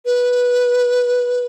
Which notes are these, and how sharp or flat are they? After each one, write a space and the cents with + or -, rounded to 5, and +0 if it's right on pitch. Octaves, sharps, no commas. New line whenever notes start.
B4 -10